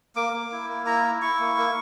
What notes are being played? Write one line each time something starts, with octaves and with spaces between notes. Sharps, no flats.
A#3 D6
A#3
E4
A#3
E4 A#5
E4
E4 C#6
A#3
A#3